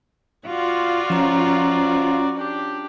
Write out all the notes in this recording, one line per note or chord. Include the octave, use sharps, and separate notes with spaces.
F4 F#4 D5
F3 C#4 C#5 A#5
D4 G4